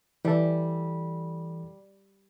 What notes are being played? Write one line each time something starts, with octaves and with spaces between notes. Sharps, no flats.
E3 G3 A4